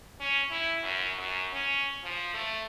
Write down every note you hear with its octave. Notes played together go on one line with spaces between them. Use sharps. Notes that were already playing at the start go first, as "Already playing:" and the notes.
C#4
E4
F#2
F#2
C#4
F3
A3